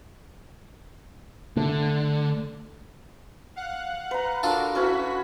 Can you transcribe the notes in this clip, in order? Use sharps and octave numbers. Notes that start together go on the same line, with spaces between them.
D3 A3
F5 F#5 F#6
B4 A#5
D4 F4 F#4 A4 A#4
C#4 E4 F#4 B4 B6